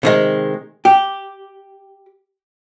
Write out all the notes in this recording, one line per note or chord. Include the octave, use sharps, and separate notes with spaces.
C3 D#3 G#3
G4